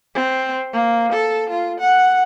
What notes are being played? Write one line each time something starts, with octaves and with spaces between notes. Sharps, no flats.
C4
A#3
A4
F4
F#5